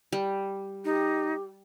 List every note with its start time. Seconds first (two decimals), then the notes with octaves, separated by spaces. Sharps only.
0.12 G3
0.85 D#4 G4